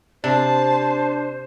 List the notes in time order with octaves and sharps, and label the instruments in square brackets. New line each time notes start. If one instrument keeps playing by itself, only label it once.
[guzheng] C3 [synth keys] D4 [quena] C5 [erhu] A5